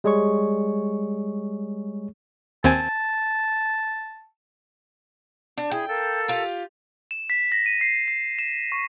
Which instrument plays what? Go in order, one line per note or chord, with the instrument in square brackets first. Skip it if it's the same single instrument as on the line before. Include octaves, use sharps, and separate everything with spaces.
[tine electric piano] G3 G#3 G#4 C#5 C#6
[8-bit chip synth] D#2 C4 G#5 [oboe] A5
[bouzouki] D4
[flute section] E4 G#4 [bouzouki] G5
[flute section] A4 A#4 F5
[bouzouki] F4 G4
[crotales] E7
B6
A#6
D#7
C7
C7
E7
C#6